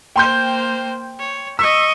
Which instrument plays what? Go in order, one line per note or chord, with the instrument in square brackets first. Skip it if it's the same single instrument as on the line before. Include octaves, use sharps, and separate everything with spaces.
[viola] A#3 C5 [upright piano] G5 C6 G6
[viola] C#5
[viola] D#5 C#6 [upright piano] E6 B6 E7